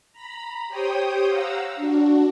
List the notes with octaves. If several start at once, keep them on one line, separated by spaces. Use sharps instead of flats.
A#5 B5
G4 C5 C#5 G5 D#6
F5 F#5 A#5 E6
D4 F#4